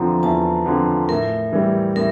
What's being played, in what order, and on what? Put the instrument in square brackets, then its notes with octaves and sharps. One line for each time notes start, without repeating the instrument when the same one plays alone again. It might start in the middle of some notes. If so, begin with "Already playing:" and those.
Already playing: [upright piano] E2 D3 F3 C4 [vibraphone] A#5
[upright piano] E2 [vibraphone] A5
[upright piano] D3 F3 C4
[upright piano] A2 [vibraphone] A#4
[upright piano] E3 G3
[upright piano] A2 [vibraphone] A#4